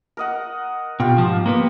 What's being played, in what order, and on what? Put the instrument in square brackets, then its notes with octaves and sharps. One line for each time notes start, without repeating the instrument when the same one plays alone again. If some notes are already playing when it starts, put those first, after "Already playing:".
[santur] A#4 D#5 F#5
[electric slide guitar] B2 [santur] F4 G4 G5
[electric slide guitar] G#2 F3
A#3 B3 B4